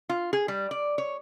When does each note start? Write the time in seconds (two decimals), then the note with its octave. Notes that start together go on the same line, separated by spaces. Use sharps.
0.09 F4
0.33 G#4
0.48 G3
0.71 D5
0.98 C#5